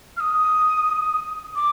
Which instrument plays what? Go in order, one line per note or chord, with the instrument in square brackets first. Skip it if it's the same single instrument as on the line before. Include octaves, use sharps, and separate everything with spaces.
[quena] F6
D#6
D6